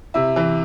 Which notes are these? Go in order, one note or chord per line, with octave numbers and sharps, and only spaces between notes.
C3 E4
E3